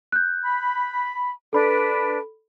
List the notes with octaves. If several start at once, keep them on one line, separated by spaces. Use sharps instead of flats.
F#6 G6
B5
D4 A4 B4 B5